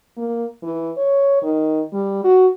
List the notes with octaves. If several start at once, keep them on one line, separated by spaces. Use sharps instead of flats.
A#3
E3
C#5
D#3
G3
F#4